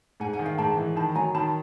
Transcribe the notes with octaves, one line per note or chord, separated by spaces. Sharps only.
G#2 F#5 G#5
F#5 G#5
D#3
F5 G5
G#2 G5 A5
E3
D#3 A5 B5
F#3 G#5 A#5
D#3 A5 B5